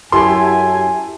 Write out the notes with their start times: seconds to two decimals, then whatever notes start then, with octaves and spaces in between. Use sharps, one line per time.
0.12 F#2 E4 G4 A4 G#5 C6